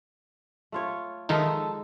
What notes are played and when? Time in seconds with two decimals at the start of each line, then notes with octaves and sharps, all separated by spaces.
0.72 A3 F4 C#5
1.29 D#3 F3 G#3 D#4 A4 E5